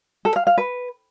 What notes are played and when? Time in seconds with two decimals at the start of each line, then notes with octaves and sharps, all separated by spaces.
0.25 A4
0.36 F5
0.47 F5
0.58 B4